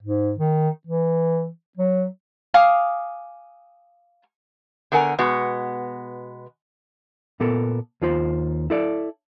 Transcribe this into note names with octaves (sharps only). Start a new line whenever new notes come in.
G#2
D#3
E3
F#3
F5 G#5 D6 D#6
D3 B3 A#4 F#5 G#5
B2 G#3 B3 F#4
A#2 B3 A4 A#4
D#2 F4 C5
E4 A4 D5